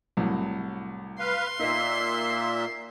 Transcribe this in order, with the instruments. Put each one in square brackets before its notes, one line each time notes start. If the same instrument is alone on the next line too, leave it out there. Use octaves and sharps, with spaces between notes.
[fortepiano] C2 A2 F#3
[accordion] B4 F5 [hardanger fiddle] C6
[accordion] A#2 A#3 E5 [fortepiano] D#4 A#4 D#5